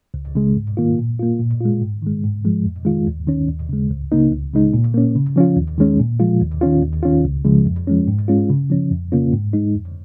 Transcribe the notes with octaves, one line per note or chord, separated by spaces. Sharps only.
C#2
C#3 G#3
G#2
D#3 A#3 F4
A#2
A#3 F4
A#2
G#3 F4
G#2
D#3 G#3
G#2
F3 G#3
F2
D#3 G#3 F4
D#2
D#3 C#4
D#2
C#3 G#3
C#2
C#3 A#3 D#4
C#2
C#3 G#3 D#4
A#2
A#3 C#4
C#3
F3 C#4 F4
D#2
D#3 G#3 C#4
A#2
F3 G#3 F4
D#2
D#3 C#4 F4
D#2
D#3 C#4 F4
C#2
C#3 F3 G#3
F2
F3 G#3 C#4
G#2
G#3 C#4 F4
C#3
F3 C#4
F2
C#3 A#3 C#4 F4
G#2
G#3 D#4
F2